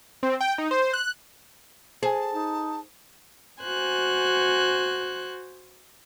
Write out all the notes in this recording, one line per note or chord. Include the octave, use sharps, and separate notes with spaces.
C4
G5
D#4
C5
F#6
G#4 C5 G#5 A5
D#4
F#4 C5 G#5 F#6